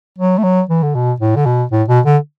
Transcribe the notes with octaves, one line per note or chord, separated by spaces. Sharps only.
F#3
A3
F#3
E3
D3
B2
A2
D3
B2
A2
B2
D3